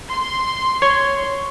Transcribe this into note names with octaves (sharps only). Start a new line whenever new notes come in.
C6
C#5